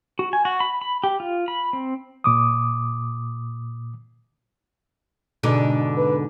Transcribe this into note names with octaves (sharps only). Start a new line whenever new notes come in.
F#4
G#5
F#4
B5
B5
G4
F4
B5
C4
A#2 D6 D#6
G#2 B2 D3 D4
B4